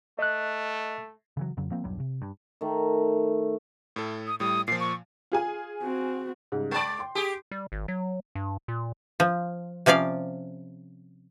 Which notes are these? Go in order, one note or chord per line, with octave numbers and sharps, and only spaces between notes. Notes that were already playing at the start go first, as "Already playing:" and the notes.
A3 D#5 F#6
C#3 E3 F#3
F2 C#3 F#3
F3 A#3 C4
E1 B1 G2 F#3
C3
G2
D#3 A3
A2 A4
D#6
A2 G3 D#6
A#2 F3 C7
C#6
F4 G#4 G#5
C4 F#4
G#2 C#3 G3
G#3 D5 G5 A5 B5
G5 C6
G4 G#4
G3
G#1
F#3
G2
A#2
F3
C3 F3 C#4 D5 F5